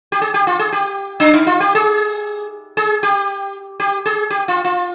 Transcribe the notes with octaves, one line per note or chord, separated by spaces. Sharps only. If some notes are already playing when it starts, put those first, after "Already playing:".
G4
G#4
G4
F4
G#4
G4
D4
D#4
F4
G4
G#4
G#4
G4
G4
G#4
G4
F4
F4